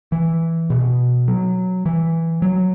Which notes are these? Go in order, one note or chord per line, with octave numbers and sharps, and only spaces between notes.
E3
B2
F#3
E3
F#3